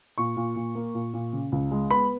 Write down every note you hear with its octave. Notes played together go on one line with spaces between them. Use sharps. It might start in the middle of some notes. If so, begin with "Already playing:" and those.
A#2 C#6
A#2
A#2
A#3
A#2
A#2
C#3
C#2
G#3
B3 B5